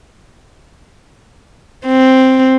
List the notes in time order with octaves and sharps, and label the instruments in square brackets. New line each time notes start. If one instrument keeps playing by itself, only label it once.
[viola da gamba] C4